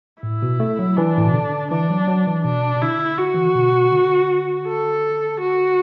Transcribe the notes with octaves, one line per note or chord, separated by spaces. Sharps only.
A2 E4
B2
A3
F#3
E3 D4
A2
B2
D3
E3 D4
F#3
F#3
E3
B2 D4
B2
D3 E4
D3 F#4
E3
D3
B2
D3
A4
F#4